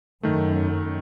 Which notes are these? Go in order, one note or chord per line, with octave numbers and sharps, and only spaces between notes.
F#2 D#3 A3